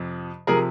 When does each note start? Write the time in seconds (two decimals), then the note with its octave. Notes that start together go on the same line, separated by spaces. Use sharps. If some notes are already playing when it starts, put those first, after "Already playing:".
Already playing: F2 C3 F3
0.47 C3 F3 G#4 A#4